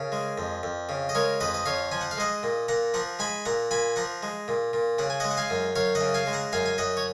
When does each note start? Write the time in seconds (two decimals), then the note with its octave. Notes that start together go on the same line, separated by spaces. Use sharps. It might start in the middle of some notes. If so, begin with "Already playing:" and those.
Already playing: C#3 A#4
0.12 G#3
0.38 F2
0.63 F2
0.89 C#3
1.09 D#5
1.15 G#3 A#4 C#5
1.40 F2 B4 D#5
1.54 D#5
1.66 F2 C#5 F5
1.91 F3 G#5
2.01 F#5
2.11 F5
2.17 G#3 D#5 F#5
2.43 A#2
2.68 A#2 F#5 A#5
2.94 F3 F#5 A#5
3.19 G#3 G#5 B5
3.45 A#2 F#5 A#5
3.71 A#2 G#5 B5
3.96 F3 F#5 A#5
4.22 G#3
4.48 A#2
4.73 A#2
4.98 C#3 F#5
5.10 G#5
5.20 G#3 D#5 F#5
5.31 F#5
5.37 F5 G#5
5.50 F#2
5.75 F#2 C#5 F5
5.95 D#5 F#5
6.01 C#3
6.14 F5 G#5
6.27 G#3
6.33 F#5 A#5
6.53 F#2 F5 G#5
6.66 G#5
6.78 F#2 D#5 F#5
6.97 C#5